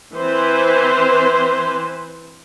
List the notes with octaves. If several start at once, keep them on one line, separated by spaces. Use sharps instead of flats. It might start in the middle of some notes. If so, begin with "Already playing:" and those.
E3 C4 B4 C5